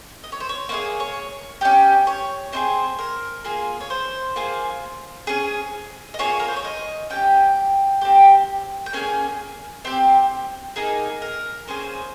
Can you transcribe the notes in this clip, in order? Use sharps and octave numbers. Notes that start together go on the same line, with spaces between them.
D#5
C#5
C5
C#5
A#3 D#4 G#4 C#5
C#5
C#4 G4 G5
C#5
C4 D#4 G#4 C5
A#4
A#3 F4 G#4
C#5
C5
A#3 F4 G#4
C#4 G#4
D#5
A#3 F4 G#4 C#5
A#4
C5
C#5
D#5
C#4 G4 G5
C4 G4
G5
A#3 C#4 G#4 G#5
C4 G4
A#3 D#4 G#4 A#4
A#4
A#3 C#4 G#4 C5